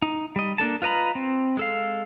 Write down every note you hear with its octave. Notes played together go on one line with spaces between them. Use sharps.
D#4
G3 D#5
A#3 D4 A4 A5
F4 B4 D#5 A#5 B5
C4
G#3 A4 F5